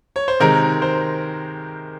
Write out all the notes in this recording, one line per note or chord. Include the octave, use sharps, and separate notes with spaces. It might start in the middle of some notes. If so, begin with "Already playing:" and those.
C#5
C5
C3 D#3 G#3 A#4
C5